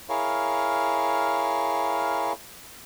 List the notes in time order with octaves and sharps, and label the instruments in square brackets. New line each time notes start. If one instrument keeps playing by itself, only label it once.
[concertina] E4 G#4 A#4 C#5 F5